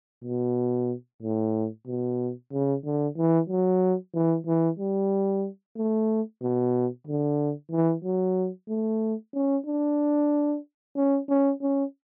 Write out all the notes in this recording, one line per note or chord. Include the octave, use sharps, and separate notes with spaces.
B2
A2
B2
C#3
D3
E3
F#3
E3
E3
G3
A3
B2
D3
E3
F#3
A3
C#4
D4
C#4
C#4
C#4